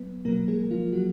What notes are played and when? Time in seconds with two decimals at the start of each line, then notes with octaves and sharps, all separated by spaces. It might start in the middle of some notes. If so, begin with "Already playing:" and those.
Already playing: F#3 B3 B4
0.25 B2 F#3 A#3 A#4
0.48 G#3 G#4
0.71 F3 F4
0.93 F#3 F#4